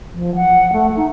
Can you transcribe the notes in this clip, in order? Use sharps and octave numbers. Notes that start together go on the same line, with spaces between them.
F3
F#5
A3
D#4